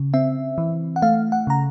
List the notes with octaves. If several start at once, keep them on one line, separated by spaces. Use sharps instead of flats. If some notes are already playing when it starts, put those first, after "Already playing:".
Already playing: C#3
C4 E5
E3
F#5
A3 F5
F#5
C#3 A#5